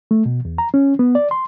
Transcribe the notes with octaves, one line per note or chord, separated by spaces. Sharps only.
A3
B2
E2
A#5
C#4
B3
D5
C6